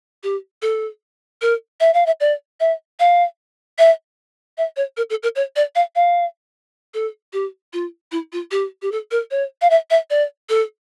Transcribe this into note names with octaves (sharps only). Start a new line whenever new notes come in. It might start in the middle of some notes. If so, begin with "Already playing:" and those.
G4
A4
A#4
E5
F5
E5
D5
E5
F5
E5
E5
C#5
A#4
A4
A#4
C#5
D5
F5
F5
A4
G4
F4
E4
F4
G4
G4
A4
A#4
C#5
F5
E5
E5
D5
A4